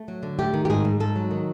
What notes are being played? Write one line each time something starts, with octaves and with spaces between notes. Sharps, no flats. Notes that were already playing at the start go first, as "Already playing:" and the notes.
Already playing: A3
F#3
D3
A3 G4
D#3
G4
G#2 G#4
G#2
G#2 A4
F#3
D#3